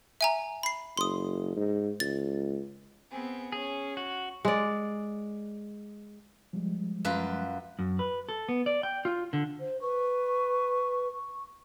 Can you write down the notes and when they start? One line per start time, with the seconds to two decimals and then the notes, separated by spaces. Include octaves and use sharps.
0.21 E5 G#5 A#5
0.63 B5 C7
0.97 F#1 C6 D#6
1.56 G#2
2.00 C#2 A6
3.10 B3 C4 G#4
3.52 C#4 G#4
3.97 F#4
4.45 G#3 D5
6.53 F3 G3 G#3
7.05 F#2 F4 B4
7.79 F#2
7.99 B4
8.29 A4
8.49 B3
8.66 D5
8.83 G5
9.05 F4
9.33 D3
9.60 C5
9.81 B4 C#6